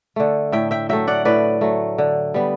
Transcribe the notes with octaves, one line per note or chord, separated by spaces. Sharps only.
D3 A3
A2 E5 G5
E5 G5
F#3 A3 E5 G5
D5 F#5
A2 B4 D5
F#3 A3
D3
G3 B3